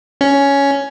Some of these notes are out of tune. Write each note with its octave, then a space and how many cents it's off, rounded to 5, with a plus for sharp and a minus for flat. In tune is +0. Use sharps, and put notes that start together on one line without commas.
C#4 +10